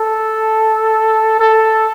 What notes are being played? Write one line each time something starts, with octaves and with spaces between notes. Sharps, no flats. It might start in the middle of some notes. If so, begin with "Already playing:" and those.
Already playing: A4
A4